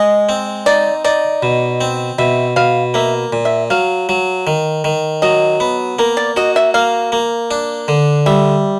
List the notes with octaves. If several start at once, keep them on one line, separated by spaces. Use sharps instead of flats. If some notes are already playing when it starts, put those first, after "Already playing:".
Already playing: G#3 D#5
C4
D#4 D5
D#4 D5
B2
C4
B2 E5
B2 F5
A#3 E5
A#2
E5
F#3 F5
F#3
D#3
D#3
F#3 D#5
B3
A#3 A#4
D5
F#4 D#5
E5
A#3 F5
A#3
D4
D3
G3 E5